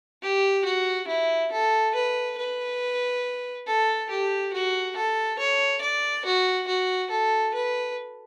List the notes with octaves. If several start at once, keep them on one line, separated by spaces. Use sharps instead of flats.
G4
F#4
E4
A4
B4
B4
A4
G4
F#4
A4
C#5
D5
F#4
F#4
A4
B4